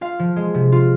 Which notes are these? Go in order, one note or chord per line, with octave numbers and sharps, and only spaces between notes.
F4 F5
F3
G#3
C3
F4